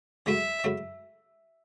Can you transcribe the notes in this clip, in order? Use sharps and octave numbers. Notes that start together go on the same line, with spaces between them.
C#3 F#3 A3 E4 E5
C#3 F#3 A3 E4